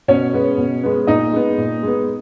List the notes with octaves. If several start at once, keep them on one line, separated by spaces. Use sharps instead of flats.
B2 C#4 C#5
G#3 B3
B2
G#3 B3
A#2 D#4 D#5
G#3 B3
A#2
G#3 B3